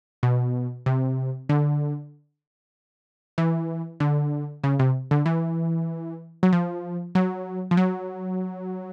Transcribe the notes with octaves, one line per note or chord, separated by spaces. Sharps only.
B2
C3
D3
E3
D3
C#3
C3
D3
E3
F#3
F3
F#3
F3
F#3